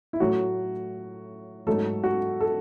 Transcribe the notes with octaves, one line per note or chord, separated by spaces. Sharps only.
E4
A2 F#3 A3 F#4
G#2 F#3 A3 A4
F#4
A4